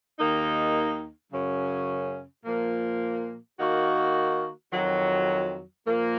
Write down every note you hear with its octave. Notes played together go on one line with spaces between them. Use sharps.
D#2 D#3 A#3 D#4
F#2 C#3 F#3 C#4
A#2 F3 A#3
D#3 A#3 D#4 F#4
F2 D#3 F#3
A#2 F3 A#3